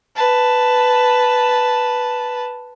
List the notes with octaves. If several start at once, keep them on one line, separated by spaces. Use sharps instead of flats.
B4 A5